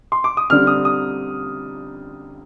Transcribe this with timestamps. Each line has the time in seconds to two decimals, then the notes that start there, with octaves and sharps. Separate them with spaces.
0.12 C6
0.24 D6
0.37 D#6
0.50 D3 G3 C4 F6
0.67 D#6
0.85 D#6